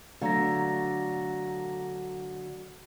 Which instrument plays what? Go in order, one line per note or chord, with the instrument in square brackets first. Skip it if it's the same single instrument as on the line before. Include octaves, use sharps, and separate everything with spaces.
[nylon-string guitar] D3 F#3 A3 [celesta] F5 A#5 A#6